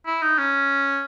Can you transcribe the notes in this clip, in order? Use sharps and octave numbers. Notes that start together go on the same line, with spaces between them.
E4
D#4
C#4